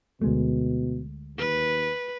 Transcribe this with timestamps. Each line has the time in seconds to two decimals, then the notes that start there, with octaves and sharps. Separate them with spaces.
0.22 D2 B2 G#3 A3
1.38 D#2 B4